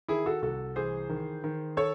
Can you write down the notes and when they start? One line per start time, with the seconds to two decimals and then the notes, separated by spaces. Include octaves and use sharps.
0.08 D#3 E4 G#4
0.26 F#4 A4
0.42 C2 F#4 A4
0.76 E3 G#4 C5
1.09 D#3
1.44 D#3
1.77 A4 C#5